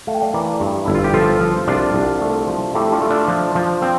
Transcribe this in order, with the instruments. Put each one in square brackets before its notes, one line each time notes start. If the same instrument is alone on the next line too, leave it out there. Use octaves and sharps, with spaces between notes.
[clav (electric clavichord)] A3 F5
G5
D5 F5
E3 A#4 D5
G2
G1 E4
F4
G4
F3 F4 A4
F3
C2 D4 F4
C2
A3
F3
A3 E4 G4
D4 F4
A3
D4 F4
F3
F3
C4